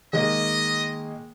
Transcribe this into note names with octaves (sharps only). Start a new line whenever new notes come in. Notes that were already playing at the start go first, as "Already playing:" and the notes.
D#3 G#3 A#3 D#5